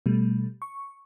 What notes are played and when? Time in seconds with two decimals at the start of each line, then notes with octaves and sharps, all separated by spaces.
0.06 B2 G3 A3
0.62 C#6